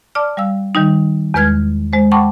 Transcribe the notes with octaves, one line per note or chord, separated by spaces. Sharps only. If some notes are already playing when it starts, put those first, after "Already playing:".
D5 A5 D6 F6
G3 F5 E6
D#3 G3 D#4
E2 G#3 B4 F6 G#6
G#3 C5
F#5 G5 A5 B5 C#6 D6